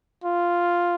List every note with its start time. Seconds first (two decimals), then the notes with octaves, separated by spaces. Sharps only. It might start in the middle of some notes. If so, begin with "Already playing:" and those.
0.24 F4